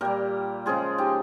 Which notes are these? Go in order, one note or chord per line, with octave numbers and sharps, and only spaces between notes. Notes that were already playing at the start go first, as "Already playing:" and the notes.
A#2 G3 G4 A#4
C#3 F3 G#3 F4 G#4
D#4 G4